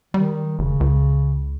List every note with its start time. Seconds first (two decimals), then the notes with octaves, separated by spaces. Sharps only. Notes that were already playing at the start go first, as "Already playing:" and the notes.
0.14 D#3 G3
0.59 F1 C#3
0.80 C#2